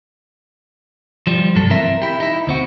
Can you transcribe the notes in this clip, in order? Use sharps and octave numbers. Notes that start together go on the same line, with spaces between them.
F3 G3
C2 G2 F#3 A3 A4
E3 C4 A#4 E5
E4 G4
D#4 E4
D2 C4 F#4